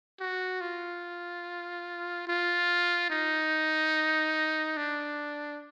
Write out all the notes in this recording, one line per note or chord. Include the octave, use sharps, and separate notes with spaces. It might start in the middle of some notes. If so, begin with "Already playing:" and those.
F#4
F4
F4
D#4
D4